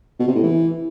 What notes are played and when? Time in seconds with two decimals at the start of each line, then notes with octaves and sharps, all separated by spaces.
0.19 B2
0.27 C3
0.35 A2
0.43 E3